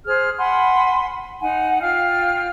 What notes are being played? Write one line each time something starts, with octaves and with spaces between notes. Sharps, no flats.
G#4 C5 F6
F#5 G#5 B5 C6
D#4 F#5 G#5
F4 F5 G5 F6